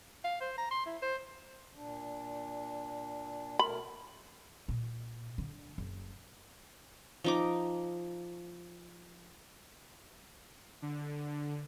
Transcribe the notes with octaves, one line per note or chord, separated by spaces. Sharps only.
F5
C5
A#5
C6
E4
C5
A#2 D4
B2 A3 A#4 B5
A#2
D3
F#1
F3 D#4 D6
D3